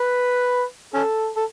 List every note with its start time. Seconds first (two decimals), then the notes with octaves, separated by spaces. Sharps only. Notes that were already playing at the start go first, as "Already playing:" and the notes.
Already playing: B4
0.94 C#4 A4
1.37 A4